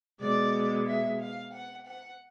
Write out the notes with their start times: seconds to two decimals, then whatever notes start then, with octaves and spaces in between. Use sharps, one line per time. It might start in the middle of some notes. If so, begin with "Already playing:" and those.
0.20 B2 G#3 D5
0.87 E5
1.20 F5
1.53 F#5
1.86 F#5